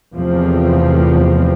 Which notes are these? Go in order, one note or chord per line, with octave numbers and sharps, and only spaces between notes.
E2 C3 F3 A3 C4